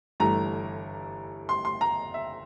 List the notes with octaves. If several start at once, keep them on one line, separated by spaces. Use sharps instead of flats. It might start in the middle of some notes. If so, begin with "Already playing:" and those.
G1 G2 E3 A3 A#5
C6
C6
A#5
E5